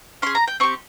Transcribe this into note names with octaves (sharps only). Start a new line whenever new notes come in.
C#4 G#4 C6
A#5
G5
C4 G4 C#6